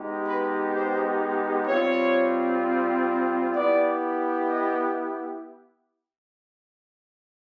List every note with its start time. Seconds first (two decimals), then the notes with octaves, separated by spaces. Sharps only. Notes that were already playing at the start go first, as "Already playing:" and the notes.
Already playing: G#3 B3 D#4 G4
0.28 B4
0.75 C5
1.68 G3 C4 F4 C#5
3.54 B3 E4 G4 D5
4.48 D#5